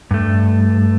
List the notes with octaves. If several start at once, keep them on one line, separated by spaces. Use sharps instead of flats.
G2 A3